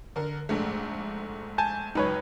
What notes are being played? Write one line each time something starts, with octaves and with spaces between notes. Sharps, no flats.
D3 A#4
A#1 G#2 A3
G#5 A5 G6
C#2 F#2 D#4 B4 C#5